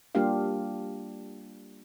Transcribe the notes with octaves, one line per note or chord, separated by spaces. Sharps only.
G3 A#3 D4 F4 G4 F5